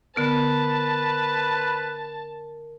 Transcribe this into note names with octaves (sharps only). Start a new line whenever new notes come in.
D3 B3 A#4 B4 A5 F6